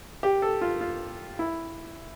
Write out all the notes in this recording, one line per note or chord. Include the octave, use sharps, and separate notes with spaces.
G4
A4
F4
F4
E4